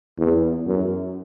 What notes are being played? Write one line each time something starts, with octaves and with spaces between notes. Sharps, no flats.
E2
F#2